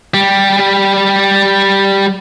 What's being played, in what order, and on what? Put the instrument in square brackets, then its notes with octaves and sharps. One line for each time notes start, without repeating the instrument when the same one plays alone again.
[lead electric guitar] G3 G4